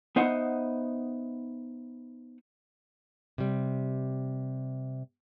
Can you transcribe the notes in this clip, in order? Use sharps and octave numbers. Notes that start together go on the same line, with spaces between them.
B3 D#4 C5 D#5 E5 F#5
C3 G3